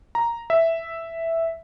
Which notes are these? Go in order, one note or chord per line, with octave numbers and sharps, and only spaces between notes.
A#5
E5